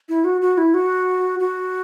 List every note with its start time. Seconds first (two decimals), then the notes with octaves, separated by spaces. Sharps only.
0.09 E4
0.24 F#4
0.41 F#4
0.58 E4
0.74 F#4
1.40 F#4